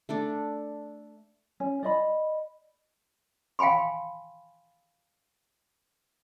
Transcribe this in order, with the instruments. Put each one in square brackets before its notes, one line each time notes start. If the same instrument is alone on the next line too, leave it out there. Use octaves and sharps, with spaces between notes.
[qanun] A3 D4 D5
[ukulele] C#4
D5 D#5 B5
[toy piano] F5 G5 G#5 B5 C6